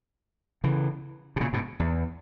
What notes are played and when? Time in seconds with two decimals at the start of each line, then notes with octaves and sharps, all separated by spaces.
0.64 C#3 E3
1.36 B2
1.40 A#2 C#3
1.53 G#2 B2
1.80 E2